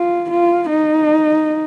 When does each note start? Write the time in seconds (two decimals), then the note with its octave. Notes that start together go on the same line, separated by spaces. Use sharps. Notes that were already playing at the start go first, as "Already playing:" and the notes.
Already playing: F4
0.30 F4
0.70 D#4